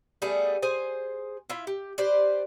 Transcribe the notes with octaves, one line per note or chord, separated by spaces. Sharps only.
G3 A3 B3 G#4
G#4 C5 G#5
E4 F4 E5
G4
G4 B4 C5 D5